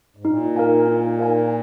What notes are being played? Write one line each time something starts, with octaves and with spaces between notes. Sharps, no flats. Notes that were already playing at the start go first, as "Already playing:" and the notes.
G#2
A#2 D#4
A#4 F5 G#5
D#4
A#4 F5 G#5